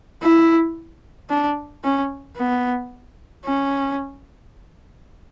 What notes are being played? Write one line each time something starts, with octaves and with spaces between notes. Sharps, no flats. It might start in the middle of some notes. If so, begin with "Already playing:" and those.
E4
D4
C#4
B3
C#4